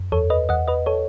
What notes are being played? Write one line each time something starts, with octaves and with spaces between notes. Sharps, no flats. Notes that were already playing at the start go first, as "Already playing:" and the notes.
Already playing: F#2
E2 A4 C#5
B4 D#5
E2 D#5 F#5
B4 D#5
A4 C#5